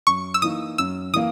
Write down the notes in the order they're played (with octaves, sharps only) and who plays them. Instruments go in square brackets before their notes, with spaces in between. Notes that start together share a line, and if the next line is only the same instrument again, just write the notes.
[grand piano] F#2 [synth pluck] C#6
[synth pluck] E6
[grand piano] E3 A#3 D#4 [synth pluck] D#6
[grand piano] F#2 [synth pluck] E6
[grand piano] E3 A#3 [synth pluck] D#6